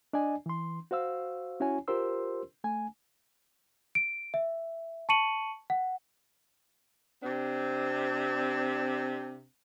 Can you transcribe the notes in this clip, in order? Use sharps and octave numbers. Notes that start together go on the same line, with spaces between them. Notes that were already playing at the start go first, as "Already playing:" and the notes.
D4 D5 D#5 G#5
E3 C6
F#4 C5 F5 E6
C#4 E4 F#4 C#5 G#5
F4 G4 A#4 C5 C6 E6
A3 G#5
D7
E5
A5 C#6 C#7 D#7 F#7
F#5
C3 C4 D4